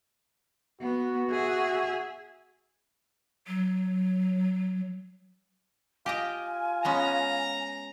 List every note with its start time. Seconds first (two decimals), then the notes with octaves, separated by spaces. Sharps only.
0.81 B3 F#4
1.30 G#4 E5
3.48 F#3
6.06 F4 G4 D#5 G5 G#5
6.85 G#3 B3 C#4 A#5